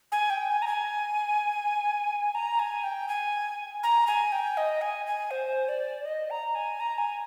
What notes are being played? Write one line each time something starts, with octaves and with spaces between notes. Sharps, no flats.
G#5
G5
G#5
A#5
G#5
A#5
G#5
G5
G#5
A#5
G#5
G5
D#5
G#5
G#5
C5
D5
D#5
A#5
G#5
A#5
G#5